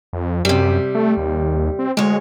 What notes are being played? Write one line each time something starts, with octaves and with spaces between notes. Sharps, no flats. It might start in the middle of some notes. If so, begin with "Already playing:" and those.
F2
F#2 C3 G3
A3
D#2
C4
D2 G#3 C#5